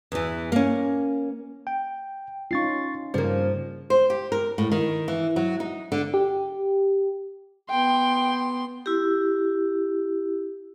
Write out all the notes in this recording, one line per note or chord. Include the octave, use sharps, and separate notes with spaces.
E2 E3
A#3 C#4
G5
C#4 D#4 F4 C#6 A6 C7
G2 C#3 F3 G3 A#3
C5
G4
A#4
A2
D#3
E3
F#3
D#4
D3
G4
B3 G5 C6
E4 G4